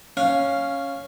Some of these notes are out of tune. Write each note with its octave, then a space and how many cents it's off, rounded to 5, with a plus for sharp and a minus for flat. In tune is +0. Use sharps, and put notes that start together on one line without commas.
C#4 +0 F5 +0